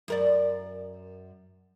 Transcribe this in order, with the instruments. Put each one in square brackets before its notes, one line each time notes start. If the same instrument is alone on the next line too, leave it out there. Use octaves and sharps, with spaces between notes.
[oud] F#2 A#4 D5